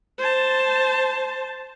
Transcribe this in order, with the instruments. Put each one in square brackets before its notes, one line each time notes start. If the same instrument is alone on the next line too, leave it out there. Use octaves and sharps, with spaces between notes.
[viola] C5 A5